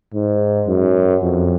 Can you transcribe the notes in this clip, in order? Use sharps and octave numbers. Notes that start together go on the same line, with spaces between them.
G#2
F#2
F2